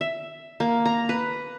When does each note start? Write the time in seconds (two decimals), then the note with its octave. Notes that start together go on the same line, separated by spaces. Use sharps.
0.01 E5
0.60 A#3
0.85 A#5
1.09 B4